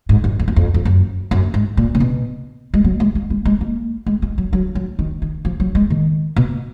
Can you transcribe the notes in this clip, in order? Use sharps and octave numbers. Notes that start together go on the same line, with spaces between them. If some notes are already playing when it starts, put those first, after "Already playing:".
G#2
F#2
F2
F#2
F2
F2
F#2
F#2
G#2
A#2
C#3
B2
G#3
F#3
G#3
A#3
G#3
G#3
A#3
G#3
A#3
F#3
F#3
F#3
D#3
D#3
F3
F#3
G#3
D#3
B2